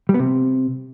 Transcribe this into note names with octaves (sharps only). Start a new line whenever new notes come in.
G3
B3
C3